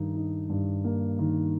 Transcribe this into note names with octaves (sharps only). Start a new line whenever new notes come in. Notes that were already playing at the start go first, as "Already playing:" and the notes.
Already playing: G2 D#3 D#4
D#4
G2
A#3
D#3